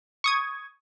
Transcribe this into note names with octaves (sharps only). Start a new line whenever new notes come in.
C#6 D#6 G#6